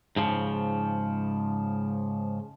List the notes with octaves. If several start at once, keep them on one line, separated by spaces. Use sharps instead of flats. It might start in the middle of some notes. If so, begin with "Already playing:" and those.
G#2 C#3 F3